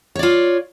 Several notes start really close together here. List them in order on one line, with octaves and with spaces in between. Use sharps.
C#5 D5 F4